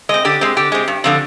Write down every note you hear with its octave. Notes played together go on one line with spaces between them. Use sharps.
G#3 C4 D#5
D3 G4
G#3 C4
D3 G4
G#3 C4
G2
D3 F3 C4